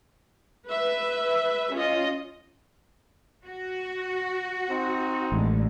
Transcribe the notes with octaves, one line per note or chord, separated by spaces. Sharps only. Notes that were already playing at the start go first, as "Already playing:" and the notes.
B4 E5
C#4 F4 D#5
F#4
C4 D#4
A1 D3 G#3